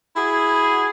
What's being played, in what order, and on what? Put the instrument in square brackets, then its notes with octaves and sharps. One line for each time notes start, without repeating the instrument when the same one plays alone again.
[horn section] E4 F#4 G#4